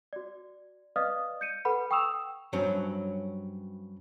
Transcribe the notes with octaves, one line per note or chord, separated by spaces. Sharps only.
F#4 D5
B4 D5 D#5 F5 D#6 F6
G6 C#7 D#7
A4 B4 F#5 B5
G5 C#6 D#6 E6 E7 F7
G2 F#3 C4 C#4